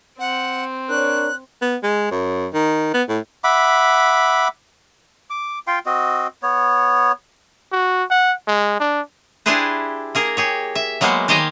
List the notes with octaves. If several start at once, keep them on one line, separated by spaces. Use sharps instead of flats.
C4 F#5
D4 A#4 C#5 F#6
B3
G#3
F#2
D#3
B3
A2
E5 F#5 B5 D6
D6
F4 F5 G5 C6
C4 F#4 D#5
B3 C#5
F#4
F#5
G#3
D4
D4 E4 G4 G#4 B4 C5
A#3 G#4 A#4
G4 G#4 C#5
E5
F#3 G#3 A#3 B3 C5
D#3 G4 C5 D#5 G#5 A#5